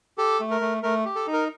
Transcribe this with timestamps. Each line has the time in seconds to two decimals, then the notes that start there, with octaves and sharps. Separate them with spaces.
0.18 G4 A4
0.40 A3
0.51 A#4
0.61 A3
0.83 A3 A#4
1.05 G4
1.15 A4
1.27 D#4
1.33 A#4